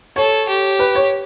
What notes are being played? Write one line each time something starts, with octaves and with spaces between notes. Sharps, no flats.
A4 C#5
G4
B4
C#5